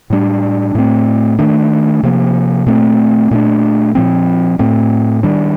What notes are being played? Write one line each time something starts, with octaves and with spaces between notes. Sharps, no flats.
A2 G3 D4
A2 A3 C4
D#3 A3 D4
C3 F3 A#3
A#2 A3 C4
A#2 A3 D4
A#2 F3 C4
A2 A3 C4
D#3 G3 D4